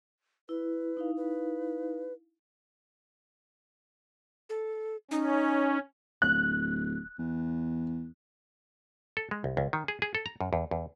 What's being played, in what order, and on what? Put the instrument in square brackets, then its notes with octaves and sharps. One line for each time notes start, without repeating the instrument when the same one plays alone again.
[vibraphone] E4 [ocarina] B4
[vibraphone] D#4 E4 F5
[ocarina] B4
[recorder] A4
[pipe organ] C#4 [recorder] D#4
[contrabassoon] D1 [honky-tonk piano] F#6
[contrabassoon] E2
[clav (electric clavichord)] A4
G#3
C2
C#2
D#3
G#4
G#4
A4
A#5
F#2
E2
E2